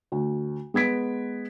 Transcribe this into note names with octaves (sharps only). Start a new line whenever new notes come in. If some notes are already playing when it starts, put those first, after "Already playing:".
D2
G#3 B3 G#6 B6 D7